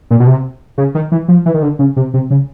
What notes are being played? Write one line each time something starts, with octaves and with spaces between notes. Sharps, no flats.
A#2
B2
C3
C#3
D#3
E3
F3
E3
D#3
D3
C#3
C3
C3
C#3